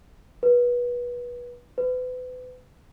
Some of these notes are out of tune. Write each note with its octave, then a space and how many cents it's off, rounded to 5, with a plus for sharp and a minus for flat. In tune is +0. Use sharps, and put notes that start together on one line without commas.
B4 -25
B4 +35